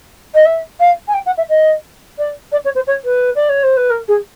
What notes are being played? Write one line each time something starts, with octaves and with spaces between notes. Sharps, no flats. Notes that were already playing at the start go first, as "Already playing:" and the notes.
D#5
E5
F5
G#5
G5
F#5
E5
D#5
D5
D5
C#5
C5
C#5
B4
D5
C#5
C5
B4
A#4
G#4